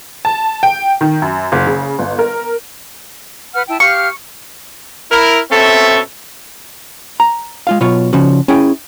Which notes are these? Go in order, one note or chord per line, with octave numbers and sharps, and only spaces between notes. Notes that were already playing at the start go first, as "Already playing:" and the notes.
A5
G5
D#3
F#2
F#1
C#3
G1
A#4
B4 F#5 F6
E4 G5 A5
G4 F5 C#6 F6
E4 A#4
B2 C4 C#4 A4 E5
A#5
G#3 F4 F5
B2 F#3 F4 C#5
C#3 F3 C#4 F#4
C#4 E4 G#4 G5